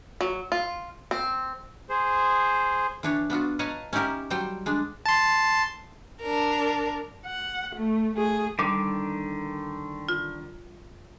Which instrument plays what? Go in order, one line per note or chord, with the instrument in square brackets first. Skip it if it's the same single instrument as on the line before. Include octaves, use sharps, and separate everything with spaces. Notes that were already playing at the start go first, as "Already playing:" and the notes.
[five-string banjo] F#3
F4
C4
[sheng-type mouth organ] G#4 C5
[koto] E3 D4 C#5
B3 D4 F4 F#4
B4 C#5 D#5 F5 A5 A#5
C#4 D#4 E4 G4 A#4
F#3 G3 C5 G5
G#3 D4
[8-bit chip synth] A5 C6
[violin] D4 A#4
[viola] F#5
A3
A3 G#4
[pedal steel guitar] D3 D#3 D6 [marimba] G3
[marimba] F4